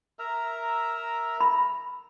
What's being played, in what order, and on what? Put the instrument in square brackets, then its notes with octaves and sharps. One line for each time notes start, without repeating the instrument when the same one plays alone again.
[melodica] A#4 E5 A#5
[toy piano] B5